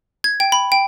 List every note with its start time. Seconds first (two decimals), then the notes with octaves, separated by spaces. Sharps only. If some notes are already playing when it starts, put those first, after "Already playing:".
0.24 G#6
0.40 G5
0.52 B5
0.72 G5